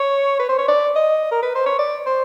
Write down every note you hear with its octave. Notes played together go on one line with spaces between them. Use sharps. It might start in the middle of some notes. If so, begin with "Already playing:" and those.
Already playing: C#5
B4
C5
C#5
D5
D#5
A#4
B4
C5
C#5
D5
C5